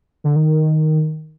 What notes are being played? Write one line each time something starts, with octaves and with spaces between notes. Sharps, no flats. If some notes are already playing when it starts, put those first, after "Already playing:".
D3
D#3